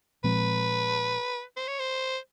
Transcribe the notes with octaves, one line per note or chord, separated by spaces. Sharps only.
A#2 F3 G#3 C4 B4
C5
C#5
C5